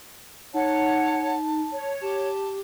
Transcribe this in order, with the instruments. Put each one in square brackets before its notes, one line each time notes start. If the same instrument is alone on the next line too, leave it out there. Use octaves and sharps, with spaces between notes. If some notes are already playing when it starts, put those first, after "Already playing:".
[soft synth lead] D#4 [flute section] C#5 F#5 [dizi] A5
[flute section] C#5
[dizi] G4 [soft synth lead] A5